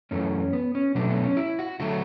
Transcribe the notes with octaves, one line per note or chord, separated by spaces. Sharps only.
F#2 E3 A3 C#4
B3
C#4
B2 F#3 A3 D4
B3
C#4
E4
F#4
D3 F#3 A3 F#4